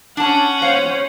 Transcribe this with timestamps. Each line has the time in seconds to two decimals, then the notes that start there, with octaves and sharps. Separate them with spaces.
0.17 C#4 D4 F#5 A5
0.62 C5 C#5 F5